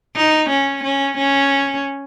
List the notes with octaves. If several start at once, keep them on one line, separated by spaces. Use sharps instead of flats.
D#4
C#4
C#4
C#4